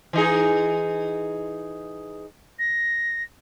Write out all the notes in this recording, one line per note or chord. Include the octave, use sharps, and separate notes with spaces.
E3 D#4 G#4
A#6